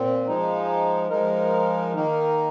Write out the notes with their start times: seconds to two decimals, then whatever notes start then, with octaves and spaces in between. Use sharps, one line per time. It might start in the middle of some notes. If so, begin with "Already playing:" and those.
Already playing: A#2 C4
0.27 F3 G#3 D#4
1.10 F3 G#3 D#4 A#4
1.94 D#3 A#3 D#4 A#4